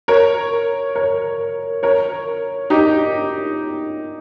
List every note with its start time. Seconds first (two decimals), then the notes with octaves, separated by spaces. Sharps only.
0.08 A#4 C#5
0.95 A#4 C#5
1.83 A#4 C#5
2.70 D#4 G4